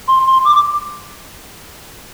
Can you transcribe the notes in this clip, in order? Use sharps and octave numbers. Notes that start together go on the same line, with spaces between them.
C6
C6
D6